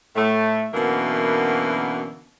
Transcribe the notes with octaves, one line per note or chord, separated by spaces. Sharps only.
A2 A3
F#2 B2 D3 E3 A#3 A#4